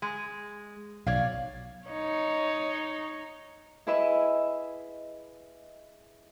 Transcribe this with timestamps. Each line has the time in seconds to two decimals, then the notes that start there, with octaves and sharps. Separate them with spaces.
0.02 G#3
1.07 B1 C#5 D5 F5
1.88 D#4 C#5
3.87 E4 G#4 B4 D#5 E5